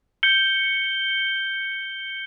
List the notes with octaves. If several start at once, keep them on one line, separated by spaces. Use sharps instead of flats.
G6 C#7 G7